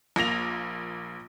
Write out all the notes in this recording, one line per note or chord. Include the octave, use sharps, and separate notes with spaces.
A#1 A#3 A#6 F7